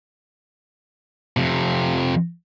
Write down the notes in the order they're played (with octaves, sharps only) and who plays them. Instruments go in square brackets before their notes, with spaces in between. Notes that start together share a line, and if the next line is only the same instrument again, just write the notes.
[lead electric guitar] F2 C3